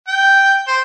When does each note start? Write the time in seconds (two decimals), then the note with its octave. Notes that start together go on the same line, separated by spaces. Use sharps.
0.08 G5
0.67 C5